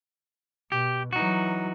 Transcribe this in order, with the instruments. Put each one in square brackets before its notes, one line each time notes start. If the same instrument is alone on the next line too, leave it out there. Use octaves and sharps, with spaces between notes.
[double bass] B2 [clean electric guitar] G4
[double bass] E3 F#3 [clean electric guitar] D#4 F#4